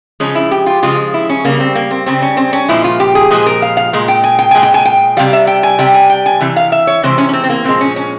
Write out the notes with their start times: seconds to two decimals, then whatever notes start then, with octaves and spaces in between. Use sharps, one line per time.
0.20 C#3 F3 G#3 C#4
0.35 E4
0.51 G4
0.66 F4
0.83 C#3 F3 G#3 F4
1.14 E4
1.29 C#4
1.45 C#3 G3 A#3
1.60 C4
1.76 A#3
1.91 C4
2.06 C#3 G3 C4
2.22 C#4
2.37 C4
2.53 C#4
2.68 A#2 F3 G#3 E4
2.84 F4
3.00 G4
3.15 G#4
3.31 A#2 F3 G#3 G#4
3.46 A#4
3.62 F5
3.77 F5
3.93 A#2 G#3
4.08 G5
4.24 G#5
4.39 G5
4.51 A#2 G#3 G#5
4.63 G5
4.74 G#5
4.85 G5
5.17 C3 G3 F5
5.33 E5
5.47 G5
5.63 G#5
5.79 C3 G3 G5
5.94 G#5
6.10 G5
6.26 G#5
6.41 C3 E3
6.56 F5
6.72 E5
6.87 C#5
7.03 C3 E3 G#3 C5
7.18 C#4
7.29 C#4
7.33 C4
7.44 C4
7.50 A#3
7.64 A#2 F3 G#3 C4
7.81 C#4
7.96 C#4